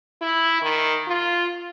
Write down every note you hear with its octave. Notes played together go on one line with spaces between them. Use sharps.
E4
D#3
F4